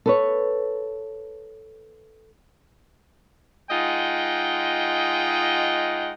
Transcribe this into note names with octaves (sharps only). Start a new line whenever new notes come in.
A4 B4 C#5
G#3 D#4 F4 D#5 F#5 G5